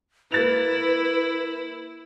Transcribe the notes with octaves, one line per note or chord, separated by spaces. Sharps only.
A#3 E4 B4 A6 F7